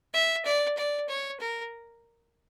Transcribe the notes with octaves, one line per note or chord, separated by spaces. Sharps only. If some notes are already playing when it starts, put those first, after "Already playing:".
E5
D5
D5
C#5
A#4